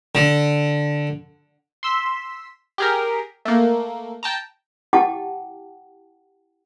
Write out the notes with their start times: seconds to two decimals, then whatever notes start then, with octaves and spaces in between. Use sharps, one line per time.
0.15 D3
1.83 C6 E6 B6
2.78 G4 G#4 A#4
3.45 A3 A#3
4.23 G5 A5 A#5
4.93 E4 G4 F#5 G5 A5 D6